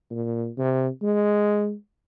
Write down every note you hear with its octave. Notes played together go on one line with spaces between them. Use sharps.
A#2
C3
G#3